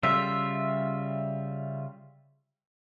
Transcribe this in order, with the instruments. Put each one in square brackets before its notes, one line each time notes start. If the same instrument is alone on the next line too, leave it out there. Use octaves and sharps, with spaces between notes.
[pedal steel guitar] C#3 G3 F4 [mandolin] E5